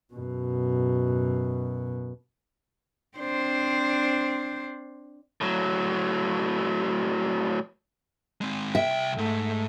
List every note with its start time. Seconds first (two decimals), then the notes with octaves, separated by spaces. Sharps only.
0.14 F#2 B2
3.18 C4 D4 C5
5.41 A2 F#3
8.41 G#3 C4
8.75 C2 E5 G5
9.18 G#2 A3